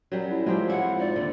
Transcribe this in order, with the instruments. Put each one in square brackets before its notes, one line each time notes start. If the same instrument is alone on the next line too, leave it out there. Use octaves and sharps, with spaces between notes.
[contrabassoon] F#2 [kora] F#3 G3
[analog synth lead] E4
[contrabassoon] F3 [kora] F#3 C4 G4 [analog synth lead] G#3
[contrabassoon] F2 [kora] E4 [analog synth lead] F4 [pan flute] F#5
[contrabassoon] G#2 [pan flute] D5
[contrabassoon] D#2 [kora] D3 [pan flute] D5